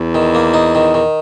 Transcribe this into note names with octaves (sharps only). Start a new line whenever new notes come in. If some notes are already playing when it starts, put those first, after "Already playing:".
Already playing: E2
D#3
A#3
D#4
D#3
D#3